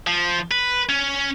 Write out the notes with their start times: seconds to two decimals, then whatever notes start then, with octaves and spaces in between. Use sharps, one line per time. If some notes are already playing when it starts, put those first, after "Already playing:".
0.07 F3
0.51 B4
0.89 C#4